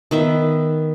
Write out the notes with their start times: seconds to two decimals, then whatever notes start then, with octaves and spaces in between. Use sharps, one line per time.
0.11 D#3 B3 E5